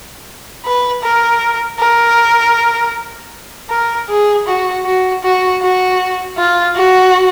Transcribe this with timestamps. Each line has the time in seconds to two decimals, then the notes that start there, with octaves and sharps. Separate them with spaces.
0.65 B4
1.03 A#4
1.80 A#4
3.70 A#4
4.09 G#4
4.47 F#4
4.86 F#4
5.23 F#4
5.62 F#4
6.38 F4
6.76 F#4